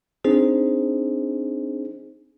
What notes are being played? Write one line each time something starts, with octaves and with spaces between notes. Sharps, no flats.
C4 D4 D#4 G#4 C5